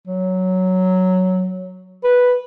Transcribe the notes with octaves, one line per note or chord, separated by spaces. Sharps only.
F#3
B4